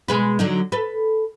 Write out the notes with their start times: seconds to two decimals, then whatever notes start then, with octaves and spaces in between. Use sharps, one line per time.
0.08 B2 G#3 B4
0.39 D3 F#3 D#4
0.72 A4 B4